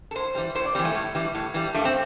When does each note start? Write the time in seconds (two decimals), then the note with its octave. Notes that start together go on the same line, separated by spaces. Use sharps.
0.11 A4
0.15 A2 C5
0.35 E3 G3
0.55 A2 C5
0.65 D5
0.75 G3 C4
0.79 E3
0.85 A3
0.94 A2
1.15 E3 G3
1.35 A2
1.54 E3 G3
1.74 G2 A3
1.85 C4